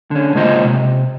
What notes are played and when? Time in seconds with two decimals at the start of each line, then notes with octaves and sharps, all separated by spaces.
0.11 D3 C#4
0.35 C#3 G#3 A#3 F4 C5 D#5
0.65 C3